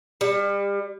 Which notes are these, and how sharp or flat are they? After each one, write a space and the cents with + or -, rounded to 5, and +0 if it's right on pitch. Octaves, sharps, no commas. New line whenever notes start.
G3 +35